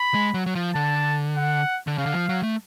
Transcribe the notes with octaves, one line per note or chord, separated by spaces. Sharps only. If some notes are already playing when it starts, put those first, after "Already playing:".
Already playing: B5
G#3
F#3
F#3
F3
D3 A5
F#5
D3
C#3 F5
D3
F3
F#3
A3